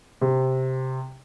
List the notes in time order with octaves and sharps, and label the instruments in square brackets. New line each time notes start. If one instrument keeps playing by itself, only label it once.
[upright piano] C3